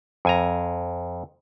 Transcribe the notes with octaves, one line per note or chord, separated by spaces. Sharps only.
F2 G#5 A#5